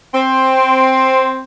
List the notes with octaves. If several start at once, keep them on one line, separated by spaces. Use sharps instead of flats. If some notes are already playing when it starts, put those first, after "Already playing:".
C4